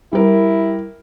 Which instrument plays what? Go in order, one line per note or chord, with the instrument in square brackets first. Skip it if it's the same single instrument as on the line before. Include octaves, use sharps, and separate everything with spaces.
[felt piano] G3 A#4 [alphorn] E4